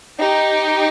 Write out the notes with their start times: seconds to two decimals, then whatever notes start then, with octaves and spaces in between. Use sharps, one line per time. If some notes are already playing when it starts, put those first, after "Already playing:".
0.21 D#4 G4